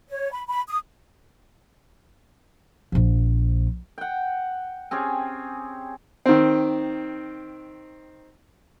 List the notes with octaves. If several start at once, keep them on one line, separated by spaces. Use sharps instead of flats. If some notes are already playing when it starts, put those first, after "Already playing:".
C#5
B5
B5
D#6
A#1 F3
F#5 G5
C4 C#4 G4 G#4
D#3 C4